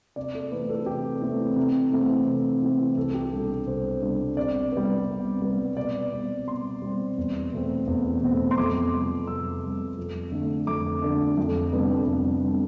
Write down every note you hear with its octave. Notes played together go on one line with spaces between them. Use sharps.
C3 D5
A4
E3 A3 C4 B4
A4
C3 G4
E3 A3 C4
C3
E3 A3 C4
C3
E3 A3 C4
C2 A4
G4
B2 G3 D4 A4
C2 C5
B2 G3 D4
C3 D5
G3 B3
C3
G3 B3
B2 D5
G3 C4
B2 C6
G3 C4
E2
B2 A3 C4
E2
B2 A3 C4
C6
F2 D6
C3 G3
F2 E6
C3 G3
F2
D3 A3 D4
F2 D6
D3 A3 D4
F2
C3 G3 B3 D4
F2
C3 G3 B3 D4